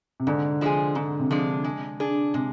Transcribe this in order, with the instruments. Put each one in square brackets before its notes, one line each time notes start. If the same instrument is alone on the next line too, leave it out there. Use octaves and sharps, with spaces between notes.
[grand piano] C3
[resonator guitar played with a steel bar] G#2 [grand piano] D3
[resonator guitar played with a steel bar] F3 G#3 D4 G#4
[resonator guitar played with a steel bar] G#2 [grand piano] D3
[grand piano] C3
[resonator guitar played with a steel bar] F3 G#3 D4 G#4
G#3
D4 G#4
[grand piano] C3 [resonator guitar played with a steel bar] G#3